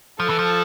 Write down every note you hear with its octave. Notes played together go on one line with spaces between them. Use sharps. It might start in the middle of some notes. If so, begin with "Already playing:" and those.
F3 A4
E3
F3